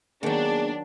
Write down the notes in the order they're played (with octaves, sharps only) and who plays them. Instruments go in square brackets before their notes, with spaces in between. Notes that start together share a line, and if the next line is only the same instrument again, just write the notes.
[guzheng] D#3 F#3 [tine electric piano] A#3 B3 [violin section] D4 [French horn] G#4